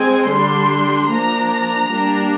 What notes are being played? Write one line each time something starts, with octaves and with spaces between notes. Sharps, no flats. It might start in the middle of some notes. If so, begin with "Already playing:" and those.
Already playing: G#3 C4 G#5
D3 G3 D4 C6
F3 A#3 D4 A#5
G3 A#3 D4